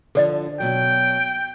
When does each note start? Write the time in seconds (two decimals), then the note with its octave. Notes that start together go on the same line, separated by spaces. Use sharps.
0.15 D3 F3 A4 D5 D#5
0.60 B2 F#3 G5